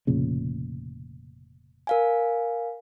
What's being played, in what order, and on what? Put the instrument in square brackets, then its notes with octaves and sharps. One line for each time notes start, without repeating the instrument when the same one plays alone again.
[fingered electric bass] F1 A#2 C#3
[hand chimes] A#4 F5 G#5